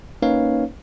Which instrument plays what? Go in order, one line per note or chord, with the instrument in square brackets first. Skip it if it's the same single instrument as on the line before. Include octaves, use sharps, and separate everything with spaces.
[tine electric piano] A#3 C#4 D#4 B4 C#5 F5